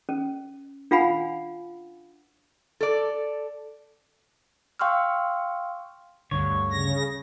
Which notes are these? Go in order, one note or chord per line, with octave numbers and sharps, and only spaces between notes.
C#4
D4 F4 F5 F#5 G#5 B5
A4 D5
F5 G5 C6 C#6 E6 F6
D2 G2 D3 C#5
C#3 A#6